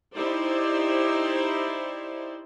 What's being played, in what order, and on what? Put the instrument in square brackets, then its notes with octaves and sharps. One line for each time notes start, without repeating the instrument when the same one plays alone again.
[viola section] D#4 E4 G4 C5 D5